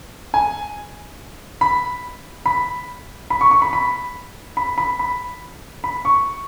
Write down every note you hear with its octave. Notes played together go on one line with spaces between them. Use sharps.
G#5
B5
B5
B5
C#6
C#6
B5
B5
B5
B5
B5
B5
C#6